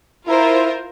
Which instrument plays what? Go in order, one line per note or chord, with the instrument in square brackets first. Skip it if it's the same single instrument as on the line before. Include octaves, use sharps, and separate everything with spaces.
[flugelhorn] E4 [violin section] F4 A#4 C5